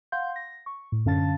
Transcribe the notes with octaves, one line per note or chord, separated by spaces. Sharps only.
F5 F#5 C6 G6
A#6
C#6
A2
F#2 D3 C#4 F5 A5 A6